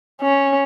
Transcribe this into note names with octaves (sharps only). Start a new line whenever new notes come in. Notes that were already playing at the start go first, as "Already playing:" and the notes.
C#4